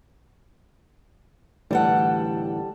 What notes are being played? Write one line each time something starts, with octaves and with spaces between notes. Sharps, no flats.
D2 A2 E3 G3 A4 F#5